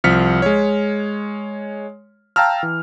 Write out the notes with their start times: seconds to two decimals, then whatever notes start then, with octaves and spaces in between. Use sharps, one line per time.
0.04 C2 F3 F6 B6 C#7
0.42 G#3 C#5
2.36 F5 G5 A5 A#5 E6 F6
2.63 E3